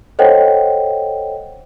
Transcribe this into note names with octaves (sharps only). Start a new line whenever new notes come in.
A4 C5 C#5 D#5 F#5 G5